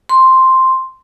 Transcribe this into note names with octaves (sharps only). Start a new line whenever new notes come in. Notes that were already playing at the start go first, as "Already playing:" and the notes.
C6